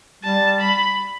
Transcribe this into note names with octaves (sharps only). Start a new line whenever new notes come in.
G3 A5
B5